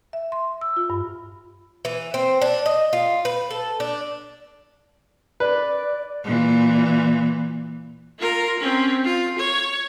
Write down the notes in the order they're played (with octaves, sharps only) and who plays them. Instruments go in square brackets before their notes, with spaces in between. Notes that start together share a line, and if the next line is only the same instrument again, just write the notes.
[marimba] E5
C6
E6
F4
G2
[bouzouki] E3
C4
D4
D#5
F4
B4
A4
D4
[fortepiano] B4 [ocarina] D5
[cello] A#2 E3
[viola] F4 A#4
C4 C#4
F4
C#5